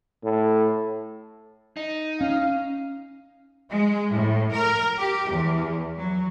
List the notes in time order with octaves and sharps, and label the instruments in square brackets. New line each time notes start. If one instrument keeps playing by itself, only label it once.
[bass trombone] A2
[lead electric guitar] D#4
[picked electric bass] C#4 [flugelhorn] F5
[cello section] G#3
A2
A#4
G4
E2
F#3